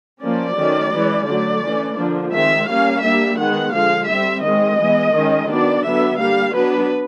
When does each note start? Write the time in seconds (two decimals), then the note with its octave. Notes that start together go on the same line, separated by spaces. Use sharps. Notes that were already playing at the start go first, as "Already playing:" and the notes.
0.22 F3 A#3 C#4 D5
0.57 D#3 F#3 A3 C#4
0.92 E3 G#3 C#4
1.27 D3 F#3 A3 D5
1.62 E3 A3 C#4
1.97 D3 F3 A#3 D4
2.32 D#3 G#3 C4 E5
2.67 G3 A#3 C#4 F5
3.02 G3 A#3 D4 E5
3.37 D#3 G#3 B3 F#5
3.73 D3 F3 G#3 F5
4.08 G3 C4 E5
4.43 D#3 G#3 C4 D#5
4.78 E3 G#3 B3
5.14 D#3 G#3 C#4
5.48 D#3 F#3 B3 D4 D5
5.83 D3 F#3 B3 D4 E5
6.18 G3 A#3 D4 F5
6.53 F#3 B3 D4 B4